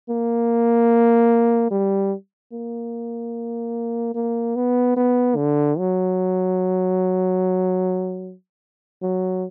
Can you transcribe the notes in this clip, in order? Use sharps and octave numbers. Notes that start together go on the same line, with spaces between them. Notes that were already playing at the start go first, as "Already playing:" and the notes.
A#3
G3
A#3
A#3
B3
B3
D3
F#3
F#3